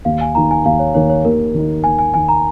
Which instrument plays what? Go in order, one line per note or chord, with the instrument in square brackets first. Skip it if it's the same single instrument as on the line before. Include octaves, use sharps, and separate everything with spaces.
[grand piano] D#2 [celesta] F5
[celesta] G#5
[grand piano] D#3 A#3 D#4 [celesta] A#5
[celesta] G#5
[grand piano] D#2 [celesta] F5
[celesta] C#5
[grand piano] D#3 A#3 D#4 [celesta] C#5
[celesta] C#5
[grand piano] D#2 [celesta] A#4
[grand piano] D#3 A#3 D#4
[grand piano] D#2 [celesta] G#5
[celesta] G#5
[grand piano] D#3 A#3 D#4 [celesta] G#5
[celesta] A#5